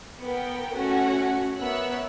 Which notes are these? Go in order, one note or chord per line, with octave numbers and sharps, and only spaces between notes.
B3 A#4 G5
A3 C#4 F#4
B3 A#4 C#5 E5 E6 F#6